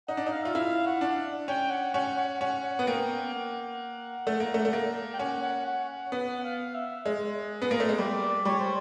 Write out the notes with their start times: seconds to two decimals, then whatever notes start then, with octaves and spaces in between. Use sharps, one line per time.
0.08 D#4 F#5
0.17 D4
0.26 D#4
0.32 F5
0.43 F4 E5
0.55 E4 F5
0.86 F#5
1.01 D4
1.48 C#4 G5
1.70 F#5
1.94 C#4 F#5
2.17 F#5
2.41 C#4 F#5
2.79 B3
2.87 A#3 G5
3.34 F#5
4.27 A3
4.40 A#3
4.54 A3
4.65 A3
4.73 A#3
5.13 G5
5.19 C#4 F#5
5.42 F#5
5.66 F#5
5.89 F#5
6.12 B3 F#5
6.44 F5
6.75 E5
7.06 G#3
7.62 B3
7.71 A#3
7.80 A3
7.89 G#3
7.98 G3 D5
8.45 G3 C#5
8.59 C5